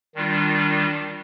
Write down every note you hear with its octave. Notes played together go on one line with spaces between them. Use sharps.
D#3 G3 D4 F4